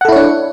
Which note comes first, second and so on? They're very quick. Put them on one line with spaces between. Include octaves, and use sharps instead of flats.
F#5 A4 E4 C#5 D4